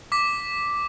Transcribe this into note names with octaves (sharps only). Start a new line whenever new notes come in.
D6 B6